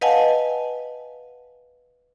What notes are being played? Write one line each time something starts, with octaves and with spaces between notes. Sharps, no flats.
B4 D#5 F5 F#5 G#5 A5